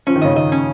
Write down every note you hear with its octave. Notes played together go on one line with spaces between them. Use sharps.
F3 C#4
D#3
C#3 D#5
D#3 D#5
C#4